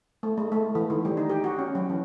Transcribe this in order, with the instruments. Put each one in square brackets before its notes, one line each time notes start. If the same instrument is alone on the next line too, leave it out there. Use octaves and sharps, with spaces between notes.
[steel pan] A3
G#3
A3
E3
D#3
G3
D#4
G4
F#4
C#4
F#3
E3